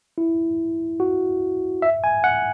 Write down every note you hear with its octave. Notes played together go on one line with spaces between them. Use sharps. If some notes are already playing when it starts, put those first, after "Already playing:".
E4
F#4
E5
G#5
F#5